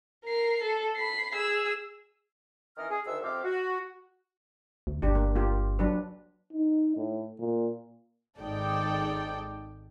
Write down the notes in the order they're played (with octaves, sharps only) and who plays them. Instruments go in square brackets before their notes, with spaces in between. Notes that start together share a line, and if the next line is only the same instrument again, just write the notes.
[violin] A#4 C7
A4
B5 C7
G#4 E6
[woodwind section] D#3 E3 C#4 A#4 D#5 F6
G#4
D2 D#3 E5 E6
F2 C3 C4 G4 F5 D6
F#4
[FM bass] D2
[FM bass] G1 [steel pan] D4 G4
[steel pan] A#3
A#3 F4 G4
F#3 D4 B4
[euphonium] D#4
A2
A#2
[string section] G#1 G#3 D#4 A4 D5 G5